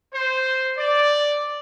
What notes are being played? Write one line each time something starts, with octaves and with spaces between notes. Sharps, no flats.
C5
D5